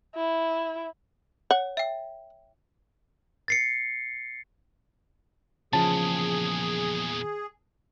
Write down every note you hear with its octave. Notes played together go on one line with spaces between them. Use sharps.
E4
C#5 F#5
E5 G5
A6 C7 C#7
E2 A#2 C#3 F3 G#4 A5